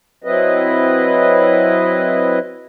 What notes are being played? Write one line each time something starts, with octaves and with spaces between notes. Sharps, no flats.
F#3 C4 E4 B4 D#5